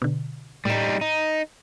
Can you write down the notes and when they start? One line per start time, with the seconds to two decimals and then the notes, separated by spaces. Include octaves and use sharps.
0.02 B2 D3
0.65 A2 G3 D#4 E7
1.01 D#4